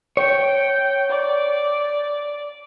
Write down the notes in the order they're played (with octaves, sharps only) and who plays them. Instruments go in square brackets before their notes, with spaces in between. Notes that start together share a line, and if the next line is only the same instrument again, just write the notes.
[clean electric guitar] C#5 [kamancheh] G5
[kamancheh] D5